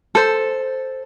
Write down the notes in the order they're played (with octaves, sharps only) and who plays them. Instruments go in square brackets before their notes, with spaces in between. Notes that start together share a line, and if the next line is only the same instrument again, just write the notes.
[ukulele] A4 C5